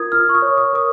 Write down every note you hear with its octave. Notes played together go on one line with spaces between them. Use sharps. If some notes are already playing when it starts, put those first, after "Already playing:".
Already playing: F4 A#4 D#6 G#6
F4 F6
C#6
D#6
C#5
D#6
A#4 D#6